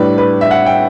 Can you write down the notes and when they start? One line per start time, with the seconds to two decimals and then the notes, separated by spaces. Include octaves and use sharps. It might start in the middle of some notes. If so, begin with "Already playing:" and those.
Already playing: A2 G3 D4 B4
0.18 B4
0.41 E5
0.51 F#5
0.66 G5